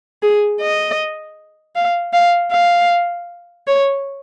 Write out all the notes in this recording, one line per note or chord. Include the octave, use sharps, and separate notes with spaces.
G#4
D#5
F5
F5
F5
C#5